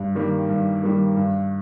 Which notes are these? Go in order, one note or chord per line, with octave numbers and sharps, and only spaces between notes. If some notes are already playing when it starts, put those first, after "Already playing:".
Already playing: G2
D#3 G3 A#3
G2
D#3 G3 A#3
G2